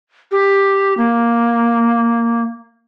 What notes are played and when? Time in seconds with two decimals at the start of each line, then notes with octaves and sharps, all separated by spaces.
0.31 G4
0.97 A#3